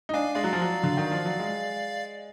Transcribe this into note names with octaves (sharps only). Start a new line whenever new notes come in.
D#4
D4 F5 G#5
G#3 D5 F5
F#3
F3
F#3
D3
D#3
F3
F#3
G#3